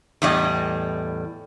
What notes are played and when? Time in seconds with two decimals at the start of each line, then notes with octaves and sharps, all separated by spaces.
0.22 E2 A2 G3 D#5